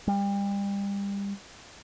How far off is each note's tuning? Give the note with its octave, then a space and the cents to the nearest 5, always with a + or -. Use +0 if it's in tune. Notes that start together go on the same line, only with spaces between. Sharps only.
G3 +30